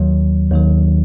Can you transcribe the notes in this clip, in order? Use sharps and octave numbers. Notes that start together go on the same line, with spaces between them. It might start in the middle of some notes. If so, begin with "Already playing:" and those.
Already playing: D#2 D#3 F#3
D#2 D#3 F#3